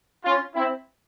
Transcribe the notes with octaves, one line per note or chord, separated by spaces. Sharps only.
C#4 F4
C4 E4